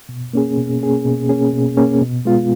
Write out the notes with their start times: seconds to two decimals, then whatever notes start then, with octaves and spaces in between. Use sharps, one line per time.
0.09 B2
0.33 A#3 C#4 G#4
0.57 B2
0.81 A#3 C#4 G#4
1.05 B2
1.29 A#3 C#4 G#4
1.53 B2
1.77 A#3 C#4 G#4
2.01 B2
2.25 G#3 B3 F4